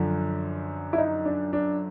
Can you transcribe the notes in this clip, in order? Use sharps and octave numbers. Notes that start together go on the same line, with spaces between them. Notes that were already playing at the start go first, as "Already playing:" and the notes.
Already playing: F#2 D3 F3
E4
D#4
D4
D4